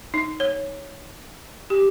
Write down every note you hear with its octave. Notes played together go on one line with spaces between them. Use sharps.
D#4
C#5
G4